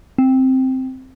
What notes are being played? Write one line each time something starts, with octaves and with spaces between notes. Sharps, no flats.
C4